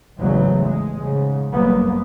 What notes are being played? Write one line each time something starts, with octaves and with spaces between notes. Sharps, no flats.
A1 E2 G#2 C#3 F#3
G#3
G#2 C#3
G1 F#2 A#3 B3